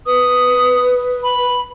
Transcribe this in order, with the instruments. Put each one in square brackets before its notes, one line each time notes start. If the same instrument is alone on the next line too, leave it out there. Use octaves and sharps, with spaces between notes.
[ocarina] B4 [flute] D#6
[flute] B5